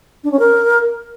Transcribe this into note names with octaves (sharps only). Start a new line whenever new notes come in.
D4
C#4
A#4